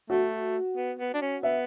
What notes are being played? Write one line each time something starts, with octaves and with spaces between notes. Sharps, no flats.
A3 F#4
B3
B3
D4
C#4
B3 E5